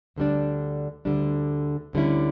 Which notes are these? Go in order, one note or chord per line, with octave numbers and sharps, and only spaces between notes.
D2 D3 G3 D4
D2 D3 G3 D4
D2 D3 G3 C#4 E4